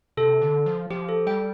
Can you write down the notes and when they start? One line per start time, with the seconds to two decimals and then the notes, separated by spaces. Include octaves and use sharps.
0.17 C3 A4
0.42 D3
0.66 F3
0.90 F3 G4
1.09 A4
1.27 G3 G5